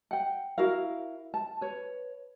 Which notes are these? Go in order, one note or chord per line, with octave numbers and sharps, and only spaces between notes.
F#5 G5
E4 F#4 A#4 F5
A5
B4 C#5